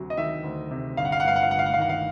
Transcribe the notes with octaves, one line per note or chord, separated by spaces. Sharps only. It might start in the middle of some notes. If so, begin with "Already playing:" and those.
Already playing: D2 C3 F#3
D#5
D#3 E5
D2
C3
G1 F5
F#5
F5
F#5
G2 F5
F#5
F5
G1 F#5
F5
F#5
F5
D#3 F#5
F5